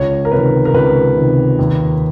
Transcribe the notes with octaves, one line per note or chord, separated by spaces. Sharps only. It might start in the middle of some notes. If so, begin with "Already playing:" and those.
Already playing: C#2 C#5
A#4
C3 B4
D#3
A#4
C#2 B4
C3 D#3
D#2